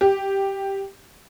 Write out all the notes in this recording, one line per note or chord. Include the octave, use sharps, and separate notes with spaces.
G4